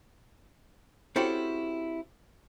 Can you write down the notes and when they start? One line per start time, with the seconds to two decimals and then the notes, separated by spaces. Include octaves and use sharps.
1.16 C4 C#4 E4 F#4 G4 A4